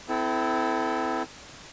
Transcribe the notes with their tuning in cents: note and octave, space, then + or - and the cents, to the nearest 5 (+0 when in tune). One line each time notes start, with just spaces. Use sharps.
C4 -30 E4 +0 A4 +0